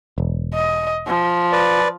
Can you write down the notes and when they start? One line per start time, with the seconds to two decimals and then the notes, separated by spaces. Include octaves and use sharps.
0.18 E1
0.54 D#5
1.07 F3
1.53 B4 D5